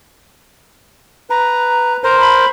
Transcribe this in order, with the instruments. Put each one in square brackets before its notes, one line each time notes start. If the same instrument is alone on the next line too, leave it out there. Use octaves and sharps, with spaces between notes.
[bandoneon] B4 [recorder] A#5
[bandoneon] A#4 C5 [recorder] A#5
[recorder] B5